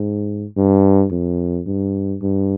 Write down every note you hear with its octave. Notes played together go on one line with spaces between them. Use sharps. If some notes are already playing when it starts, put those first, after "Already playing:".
Already playing: G#2
G2
F2
G2
G2